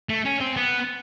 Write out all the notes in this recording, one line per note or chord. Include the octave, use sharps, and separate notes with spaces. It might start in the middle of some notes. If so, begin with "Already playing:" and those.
A3
C#4
C4
B3